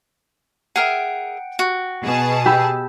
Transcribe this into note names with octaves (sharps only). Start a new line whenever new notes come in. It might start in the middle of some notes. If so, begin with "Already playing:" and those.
G#4 A#4 E5 F#5 G5 D7
F#4
B2 G#4 A5
G4 B5 E6